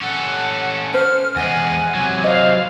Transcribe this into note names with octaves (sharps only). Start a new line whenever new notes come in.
C#4 A4 F#5
C5 F6
E2 G#3 F#5 G#5
C3 F#3 G#6
C5 D#5 F5